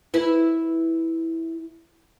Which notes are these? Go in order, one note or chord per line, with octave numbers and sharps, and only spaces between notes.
E4 B4